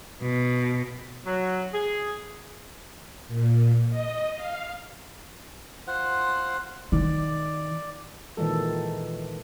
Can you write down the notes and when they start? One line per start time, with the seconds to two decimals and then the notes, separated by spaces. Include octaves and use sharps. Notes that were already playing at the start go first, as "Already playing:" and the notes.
0.22 B2
1.26 F#3
1.73 G#4
3.28 A#2
3.90 D#5
4.34 F5
5.87 F4 C5 F#5
6.92 D#3 D5
8.37 A#2 D#3 E3 G#3 A4